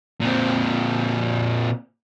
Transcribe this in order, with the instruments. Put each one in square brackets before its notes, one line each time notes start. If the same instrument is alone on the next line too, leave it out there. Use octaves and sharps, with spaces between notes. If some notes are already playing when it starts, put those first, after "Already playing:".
[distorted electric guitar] A#2 C4